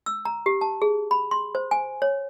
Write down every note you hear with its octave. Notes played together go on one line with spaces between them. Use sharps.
E6
A#5
G4
A5
G#4
B5
C6
C5
G#5
C#5